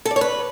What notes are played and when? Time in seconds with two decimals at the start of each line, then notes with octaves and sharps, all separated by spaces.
0.06 A4
0.11 D5
0.16 C#5
0.21 B4